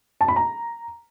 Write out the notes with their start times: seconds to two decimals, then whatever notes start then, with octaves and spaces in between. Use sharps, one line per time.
0.21 A5
0.28 B5
0.36 A#5